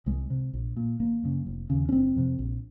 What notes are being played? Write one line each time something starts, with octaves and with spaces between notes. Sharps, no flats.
C2 G#3
C3
A#1
A#2
G#1 A#3
F#2 C#3
F1
D#2 C#3
C#4
F#1 C4
F2 C3
A#1